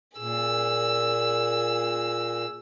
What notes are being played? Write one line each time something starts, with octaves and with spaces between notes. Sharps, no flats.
A#2 G#4 E6